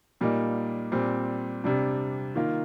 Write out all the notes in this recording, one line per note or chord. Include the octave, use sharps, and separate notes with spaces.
A#2 G3 A#3 D#4
A#2 G3 C4
C3 G3 D4
D#3 A#3 F4